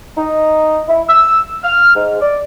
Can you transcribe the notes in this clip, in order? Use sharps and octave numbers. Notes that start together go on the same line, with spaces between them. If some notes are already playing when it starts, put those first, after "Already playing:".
D#4
E4
E6
F6
G#2
D5